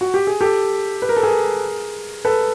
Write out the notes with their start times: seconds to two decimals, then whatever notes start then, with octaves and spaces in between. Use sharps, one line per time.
0.01 F#4
0.14 G4
0.27 G#4
0.41 G4 A4
1.02 B4
1.09 A#4
1.17 A4
1.23 G#4 A#4
2.25 A4 B4